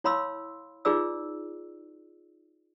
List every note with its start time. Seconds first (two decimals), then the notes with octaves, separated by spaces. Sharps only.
0.04 E4 C#5 F5 B5 C6 E6
0.85 D#4 F4 G#4 B4 D5 E6